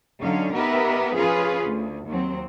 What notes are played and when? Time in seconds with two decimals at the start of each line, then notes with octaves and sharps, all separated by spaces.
0.19 D3 F#3 C#4 D#4 F5
0.53 B3 D#4 G4 A#4 B4 E5
1.13 F3 C#4 F4 G#4 B4 F5
1.62 D2
2.06 D#2 F#3 C4